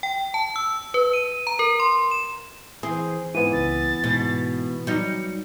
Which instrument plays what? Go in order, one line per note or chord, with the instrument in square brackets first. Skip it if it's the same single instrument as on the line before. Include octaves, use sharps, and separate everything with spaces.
[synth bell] G5
A5
E6
B4
D#7
A#5
A#4
C6
E7
[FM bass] E3 [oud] C4 [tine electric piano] G#4
[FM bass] G#2 [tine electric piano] E3 B3 [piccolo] D#7
[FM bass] C#2 [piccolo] A6
[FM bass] G#2 [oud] B2
[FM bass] F#3 [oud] G3 D#4 [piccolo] C#7